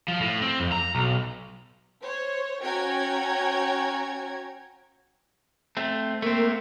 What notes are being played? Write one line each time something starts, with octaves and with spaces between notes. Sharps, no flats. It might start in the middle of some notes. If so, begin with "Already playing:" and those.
F3
A2
C4
F2
A#5
B1
C5 C#5
C#4 F#4 C#5 G5 A#5 G#6
A3 C4
A3 A#3 C4